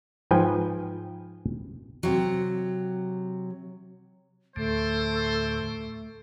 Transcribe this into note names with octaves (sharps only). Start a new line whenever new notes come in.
G#2 F3 B4 G5 G#5
C3 F#3
D2 A2 D3 A3 C5